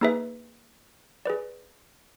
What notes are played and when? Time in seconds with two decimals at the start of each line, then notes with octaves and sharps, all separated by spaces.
0.01 A#3 D#4 G#4 B4 E5
1.26 G#4 B4 D5